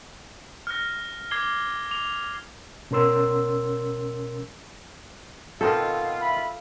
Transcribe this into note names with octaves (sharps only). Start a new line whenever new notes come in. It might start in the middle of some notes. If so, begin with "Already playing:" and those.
F6 F#6 A#6
D6 G#6 C7 G7
D6 F7
B2 C#4 A#4 C6 E6
B2 D#3 C4 F4 A4
E5 B5